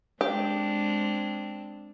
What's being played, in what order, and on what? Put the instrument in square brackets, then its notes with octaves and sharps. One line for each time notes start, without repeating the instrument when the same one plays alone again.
[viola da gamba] G#3 C4 D4 [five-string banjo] G4